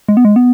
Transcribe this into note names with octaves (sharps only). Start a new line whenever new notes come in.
G#3
B3
G#3
B3